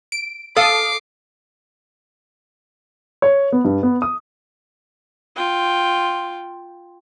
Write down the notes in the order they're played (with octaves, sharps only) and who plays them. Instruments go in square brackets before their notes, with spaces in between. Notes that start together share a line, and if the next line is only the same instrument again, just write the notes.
[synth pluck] D7
[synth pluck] A4 D#6 [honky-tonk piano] F5 [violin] D6 C7
[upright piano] C#5
B3
G2
B3
D#6
[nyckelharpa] F4 G5